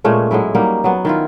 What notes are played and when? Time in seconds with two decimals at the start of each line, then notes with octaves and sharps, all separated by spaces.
0.04 A#2 G#3 A3 C#4
0.31 A2 F#3 G#3 E4
0.55 F#3 G3 A#3 D#4
0.84 F#3 B3
1.05 D#3 E4 F4